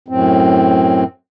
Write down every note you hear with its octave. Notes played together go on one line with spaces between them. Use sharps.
F#2 A2 C4